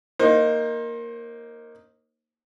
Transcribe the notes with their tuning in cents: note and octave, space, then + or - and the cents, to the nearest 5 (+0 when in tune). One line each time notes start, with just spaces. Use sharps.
A#3 +0 D#4 +0 C5 +30